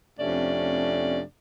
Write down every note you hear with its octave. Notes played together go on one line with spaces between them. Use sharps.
F2 C3 A3 C#4 D4 D5